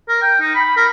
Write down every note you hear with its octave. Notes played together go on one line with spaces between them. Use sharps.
A#4
G5
D#4
B5
A#4